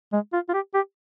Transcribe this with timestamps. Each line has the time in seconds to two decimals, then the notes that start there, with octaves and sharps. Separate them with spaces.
0.13 G#3
0.33 F4
0.49 F4
0.54 G4
0.74 G4